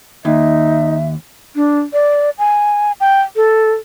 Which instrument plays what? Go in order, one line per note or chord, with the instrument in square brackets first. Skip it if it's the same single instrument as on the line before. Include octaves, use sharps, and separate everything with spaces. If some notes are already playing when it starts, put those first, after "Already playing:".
[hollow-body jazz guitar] D#2 [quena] D#4 [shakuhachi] E5
[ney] D4
D5
G#5
G5
A4